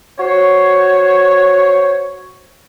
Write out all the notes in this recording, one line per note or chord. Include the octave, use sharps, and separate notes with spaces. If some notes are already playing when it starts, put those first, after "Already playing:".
F#4 C5 C#5